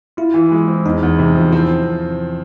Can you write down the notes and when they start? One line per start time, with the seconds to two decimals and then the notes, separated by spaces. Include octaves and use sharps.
0.17 E4 F4
0.34 E3
0.52 G#3
0.68 C4
0.86 E2 D#4
1.03 E2
1.19 C3
1.35 F3
1.52 C4 E4